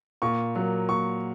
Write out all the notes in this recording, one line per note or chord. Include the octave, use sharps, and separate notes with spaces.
A#2 C#6
F#3 A#3
A#2 C#6